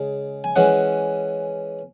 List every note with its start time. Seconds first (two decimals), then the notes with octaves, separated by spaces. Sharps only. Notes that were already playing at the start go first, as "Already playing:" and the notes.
Already playing: C#3 G#3
0.44 G#5
0.56 E3 G#3 C#4 F#5